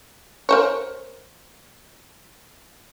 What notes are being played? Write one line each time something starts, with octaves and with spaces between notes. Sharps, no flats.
A#4 C5 C#5